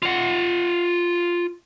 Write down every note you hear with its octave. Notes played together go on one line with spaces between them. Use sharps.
F4 F#5